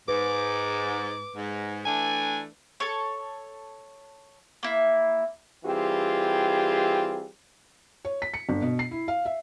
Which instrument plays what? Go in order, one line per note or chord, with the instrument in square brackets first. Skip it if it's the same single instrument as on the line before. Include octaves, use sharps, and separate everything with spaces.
[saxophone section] G#2 [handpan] B4 [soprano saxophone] D6
[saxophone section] G#2
[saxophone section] E3 A3 D4 [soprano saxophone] G#5
[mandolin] A4 C#5
A#3 E4
[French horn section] E3 G3 C4 F4 G4 G#4
[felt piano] C#5
B6
C#7
G1
B2
C7
E4
F5
E5